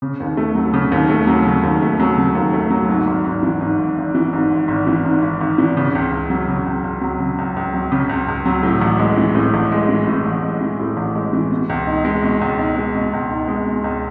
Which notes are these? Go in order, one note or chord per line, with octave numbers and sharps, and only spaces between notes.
C#3
D#2
A3
F#3
C#3
D#2
A3
F#3
C#3
D#2
A3
F#3
C#3
D#2
A3
F#3
G#2
G#1
G#1
E3
G#2
G#1
G#1
E3
G#2
G#1
G#1
E3
G#2
G#1
G#1
E3
C#3
C#2
C#2
F#3
C#3
C#2
C#2
F#3
C#3
C#2
C#2
F#3
C#3
C#2
C#2
F#3
A2
A1
G#3
E3
A2
A1
G#3
E3
A2
A1
G#3
E3
A2
A1
G#3
E3
B2
C#2
D#4
G#3
B2
C#2
D#4
G#3
B2
C#2
D#4
G#3
B2
C#2